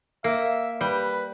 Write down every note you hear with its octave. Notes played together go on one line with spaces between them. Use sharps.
A#3 E5
G3 B4